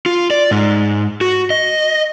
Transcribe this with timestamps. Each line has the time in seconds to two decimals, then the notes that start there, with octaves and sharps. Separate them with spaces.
0.06 F4
0.31 D5
0.51 G#2
1.21 F#4
1.50 D#5